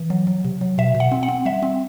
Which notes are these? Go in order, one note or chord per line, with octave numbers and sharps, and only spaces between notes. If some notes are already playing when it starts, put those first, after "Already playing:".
Already playing: E3
F#3
F#3
C3
F#3
B2 E5
B2
F#5
C4
F#5
C4
G3 E5
C4